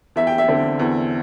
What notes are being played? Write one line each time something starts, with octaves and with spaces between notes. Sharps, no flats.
E2 E5
G5
E5
D3 C4
E2